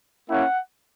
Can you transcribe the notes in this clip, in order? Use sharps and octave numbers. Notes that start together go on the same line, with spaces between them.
A#3 C#4 E4 F#5